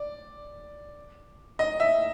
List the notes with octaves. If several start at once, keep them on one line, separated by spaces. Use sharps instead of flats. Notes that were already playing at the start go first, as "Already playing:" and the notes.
Already playing: D5
D#5
E5